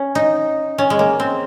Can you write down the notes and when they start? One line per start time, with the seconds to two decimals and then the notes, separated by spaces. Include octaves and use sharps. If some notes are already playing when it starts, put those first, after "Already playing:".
Already playing: C#4
0.15 D#4
0.78 C#4
0.90 G#3
0.99 A#3
1.20 C4